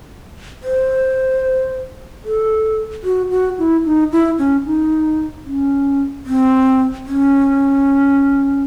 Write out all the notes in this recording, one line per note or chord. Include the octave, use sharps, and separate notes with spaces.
C5
A4
F#4
F#4
E4
D#4
E4
C#4
D#4
C#4
C4
C#4